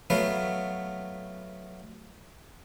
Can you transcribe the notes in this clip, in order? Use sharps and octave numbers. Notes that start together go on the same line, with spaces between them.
F#3 A3 B3 B4 F5